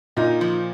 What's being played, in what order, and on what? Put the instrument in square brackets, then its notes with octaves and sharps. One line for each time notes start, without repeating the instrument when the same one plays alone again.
[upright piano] A#2 [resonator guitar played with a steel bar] D#4
[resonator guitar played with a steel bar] F3